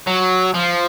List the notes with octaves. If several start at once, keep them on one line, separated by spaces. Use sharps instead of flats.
F#3
F3